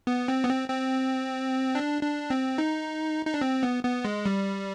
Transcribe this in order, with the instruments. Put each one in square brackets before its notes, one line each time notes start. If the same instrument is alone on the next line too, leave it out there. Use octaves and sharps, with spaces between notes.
[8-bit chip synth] B3
C4
B3
C4
C4
D4
D4
C4
D#4
D#4
D4
C4
B3
B3
G#3
G3